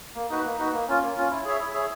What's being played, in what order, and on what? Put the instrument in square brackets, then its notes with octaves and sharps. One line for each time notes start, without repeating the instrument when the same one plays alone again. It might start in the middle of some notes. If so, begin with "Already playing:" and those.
[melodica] A#3
D#4 F#4 B4
A#3
D#4 F#4 B4
A#3
C#4 F4
A#3
C#4 F4
E4
G#4 C#5 E5
E4
G#4 C#5 E5